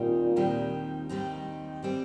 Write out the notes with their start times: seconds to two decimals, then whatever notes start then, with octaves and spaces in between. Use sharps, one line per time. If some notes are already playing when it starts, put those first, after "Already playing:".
Already playing: D#2 A#2 D#3 G3 C4 D#4
0.36 D#2 D#3 G3 C4 D#4
1.09 D#2 D#3 G3 C4 D#4
1.82 E3 G3 C4